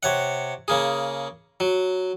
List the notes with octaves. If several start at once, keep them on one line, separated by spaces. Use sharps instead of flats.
C3 C#5 F#5
C#3 A#3 G#4
F#3